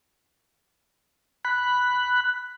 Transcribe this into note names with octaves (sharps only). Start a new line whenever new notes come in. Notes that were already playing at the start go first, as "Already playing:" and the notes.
B5 F#6